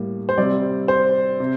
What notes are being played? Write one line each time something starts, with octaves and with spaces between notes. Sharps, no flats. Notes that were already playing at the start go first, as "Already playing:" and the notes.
Already playing: A2 G3 A#3
C5
C3 G3 C4 D5
C5
C3